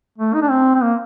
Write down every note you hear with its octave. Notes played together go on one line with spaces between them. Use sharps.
A3
D#4
D4
C4
C4
A#3